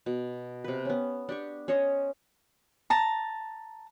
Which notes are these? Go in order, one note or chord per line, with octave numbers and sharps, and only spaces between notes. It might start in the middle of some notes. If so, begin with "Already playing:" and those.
B2
C3 B4
B3 C#4
D4 G4 C#6
C#4 C5 C#5 D#5
A5 A#5